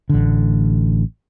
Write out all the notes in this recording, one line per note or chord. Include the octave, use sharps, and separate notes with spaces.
A1 D3